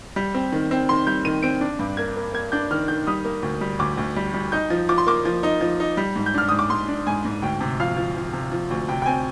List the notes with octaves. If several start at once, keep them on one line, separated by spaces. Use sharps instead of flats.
G3
C4
D#3
C4
D#3 C6
G3 G6
D#3 D#7
C4 D7
D4
G2
A#3 G#6
A#3
A#3 G#6
D4 G6
D#3 F6
D#3 G6
G3 D#6
A#3
D2
G3
D2 D6
D2
G3
G3
D#4 G6
F3
F3 D6
C6
A#3 D6
F3
D#4
F3
D#4
G3
G#2
G6
D4 F6
G#2 D#6
D6
G#2 C6
D4
G#2 G#5
G#2
D2 G5
C3
F3 F5
F3
F3
C3
F3
D2
C3 G5
G5
C4 G#5